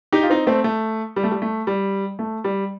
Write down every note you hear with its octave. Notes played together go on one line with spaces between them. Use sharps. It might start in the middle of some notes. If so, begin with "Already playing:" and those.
D#4 G4
F4
C4 D#4
A3 C4
A3
G3
A3
G3
A3
G3
A3
G3